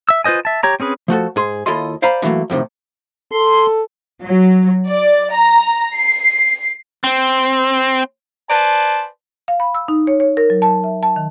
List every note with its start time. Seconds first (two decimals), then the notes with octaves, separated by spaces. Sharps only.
0.09 E5 E6
0.24 F4 B4 C5 D#5 G#5
0.45 E5 A5
0.63 G4 C#5 A#5
0.80 C4 C#4 G#4 B4
1.08 F3 A3 F#4 A4
1.36 G#2 G#4 C6
1.66 D#2 E4 F4 A4 D#5 C6
2.02 C5 D5 F5 G#5 A#5 B5
2.22 D3 E3 F#3 A3 A#3
2.50 F2 A2 C3 D#3
3.31 A4 C6
4.24 F#3
4.88 D5
5.33 A#5
5.95 C7
7.04 C4
8.50 B4 C5 D5 G#5 A5
9.48 F5
9.60 B5
9.75 E6
9.88 D#4
10.07 C#5
10.20 C#5
10.37 A#4
10.50 F#3
10.62 A5
10.84 E5
11.03 A5
11.16 D#3